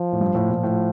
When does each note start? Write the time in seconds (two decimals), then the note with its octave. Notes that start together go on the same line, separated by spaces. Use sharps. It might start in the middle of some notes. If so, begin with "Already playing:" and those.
Already playing: F3
0.12 A2
0.21 G2
0.35 A2
0.49 A#2
0.63 A2